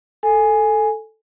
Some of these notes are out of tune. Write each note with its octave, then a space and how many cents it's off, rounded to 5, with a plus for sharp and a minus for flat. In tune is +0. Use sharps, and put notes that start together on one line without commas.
A4 +0 G#5 +0